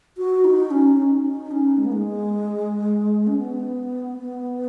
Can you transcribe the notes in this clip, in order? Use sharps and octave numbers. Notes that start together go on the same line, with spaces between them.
F#4
D#4
C#4
C#4
D#4
C#4
G#3
B3
G#3
C#4
B3
B3